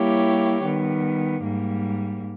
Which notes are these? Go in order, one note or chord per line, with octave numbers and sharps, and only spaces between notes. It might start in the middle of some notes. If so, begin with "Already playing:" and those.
Already playing: G3 A#3 E4 G4 C#5
D#3 G3 B3
G#2 G3 A#3